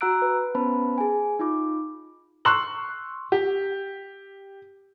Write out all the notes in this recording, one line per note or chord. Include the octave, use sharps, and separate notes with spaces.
F#4 F#5 A#5 E6 F#6 D7
B4
B3 C#4 B4 C5 A5 B5
G#4 G#5
D#4 F4 D6
C6 C#6 E6 F#6 F#7
G4